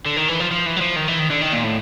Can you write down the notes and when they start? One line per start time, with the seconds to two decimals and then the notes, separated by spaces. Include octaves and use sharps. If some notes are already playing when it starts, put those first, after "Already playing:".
0.06 D3
0.17 D#3
0.28 E3
0.40 F3
0.51 F3
0.66 E3
0.76 F#3
0.81 F3
0.96 D#3
1.08 E3
1.19 D#3
1.30 D3
1.42 D#3
1.53 A#2
1.64 A2